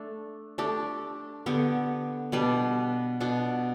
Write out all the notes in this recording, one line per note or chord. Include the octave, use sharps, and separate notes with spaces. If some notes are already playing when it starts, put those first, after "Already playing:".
Already playing: A3 D4
A3 D4 G4
D3 B3 G4
B2 G3 D4 B4
B2 B3 D4